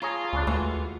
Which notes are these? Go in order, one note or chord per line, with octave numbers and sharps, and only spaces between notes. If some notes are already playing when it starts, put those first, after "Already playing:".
F4 G#4 C#5 A5 A#5
D2 C#3 D4
D#2 E3 G#3 A3 F#4